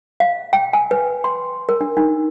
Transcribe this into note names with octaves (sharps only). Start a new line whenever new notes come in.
F5
G5
G#5
B4
C6
A#4
D4
D#4